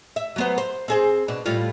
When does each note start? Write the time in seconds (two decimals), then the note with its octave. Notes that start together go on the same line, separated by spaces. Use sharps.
0.16 E5
0.36 F#3 B3 C5
0.58 C5
0.88 C4 G#4 C5
1.28 B2 D4
1.46 A2 G3 F4